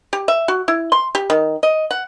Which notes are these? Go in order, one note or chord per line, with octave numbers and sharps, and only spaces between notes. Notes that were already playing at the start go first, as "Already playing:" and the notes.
G4
E5
F#4
E4
C6
G4
D#3
D#5
F#5